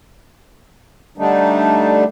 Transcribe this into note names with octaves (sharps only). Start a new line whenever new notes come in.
D3 G3 A3 D4 D#4